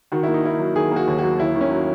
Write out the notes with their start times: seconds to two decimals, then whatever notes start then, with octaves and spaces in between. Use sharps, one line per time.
0.12 D#3 F#4
0.23 A#3 E4
0.34 D#4
0.44 A#3 E4
0.59 F#3
0.76 D#3 G#4
0.91 A#3 F#4
1.07 D#2
1.19 F#3 F#4
1.39 D#2 E4
1.55 D#3
1.61 C#4
1.71 F#3